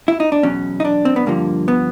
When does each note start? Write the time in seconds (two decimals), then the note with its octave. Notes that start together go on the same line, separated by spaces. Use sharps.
0.08 E4
0.20 D#4
0.32 D4
0.43 E2 B2 F#3 C#4
0.80 D#4
0.85 D4
1.05 C4
1.16 B3
1.26 G2 D3 F3 A#3
1.68 B3